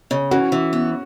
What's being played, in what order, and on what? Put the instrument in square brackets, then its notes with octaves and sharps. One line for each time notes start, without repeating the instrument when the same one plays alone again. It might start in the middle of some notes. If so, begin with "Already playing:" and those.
[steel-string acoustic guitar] C#3
[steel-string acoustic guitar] E3 [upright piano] C#4 F#4
[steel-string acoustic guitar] E3
B3